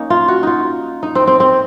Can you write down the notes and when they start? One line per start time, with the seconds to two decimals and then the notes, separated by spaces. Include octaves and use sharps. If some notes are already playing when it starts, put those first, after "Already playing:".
Already playing: A#3 C#4 D#4
0.10 F4
0.28 F#4
0.43 D#4 F4
1.03 D#4
1.15 C4
1.27 C4
1.40 C4